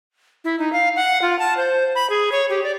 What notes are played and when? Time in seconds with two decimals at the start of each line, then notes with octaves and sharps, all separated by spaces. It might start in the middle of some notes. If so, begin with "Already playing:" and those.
0.44 E4
0.59 D#4
0.73 F5
0.96 F#5
1.22 F4
1.39 A5
1.57 C5
1.95 B5
2.10 G#4
2.32 C#5
2.49 G4
2.64 D5